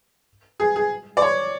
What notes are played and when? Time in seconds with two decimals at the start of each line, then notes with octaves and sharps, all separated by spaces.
0.60 G#4
0.76 G#4
1.17 D5
1.22 C#5